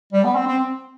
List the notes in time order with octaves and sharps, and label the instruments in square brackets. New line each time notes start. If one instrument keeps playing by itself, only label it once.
[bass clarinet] G3
B3
C4
C4